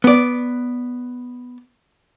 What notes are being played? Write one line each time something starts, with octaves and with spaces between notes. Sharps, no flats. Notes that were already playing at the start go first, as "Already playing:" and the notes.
B3 D5